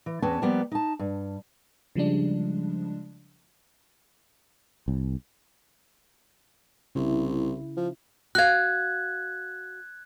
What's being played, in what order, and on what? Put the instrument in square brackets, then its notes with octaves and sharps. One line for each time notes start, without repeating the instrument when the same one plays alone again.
[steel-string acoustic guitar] E3
E2 C4 C#4 B4 A5
F3 G3 A#3 B3 G4
D#4 A5
G2
[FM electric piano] C#3 F3 G3 G#3 D4
[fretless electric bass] C2
[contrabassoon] C2 [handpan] C#3 E4
[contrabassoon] F3
[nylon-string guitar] F#4 F5 [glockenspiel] F#6 G#6